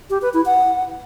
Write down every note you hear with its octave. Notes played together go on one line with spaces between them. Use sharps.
G4
B4
E4
F#5